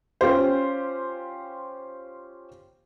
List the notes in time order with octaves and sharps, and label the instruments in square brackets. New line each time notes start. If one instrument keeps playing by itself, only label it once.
[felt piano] C#4 F4 G4 C5